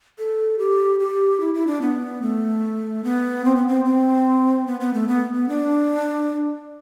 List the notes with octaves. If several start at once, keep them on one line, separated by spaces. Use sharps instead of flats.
A4
G4
G4
E4
E4
D4
B3
A3
B3
C4
B3
C4
C4
B3
B3
A3
B3
B3
D4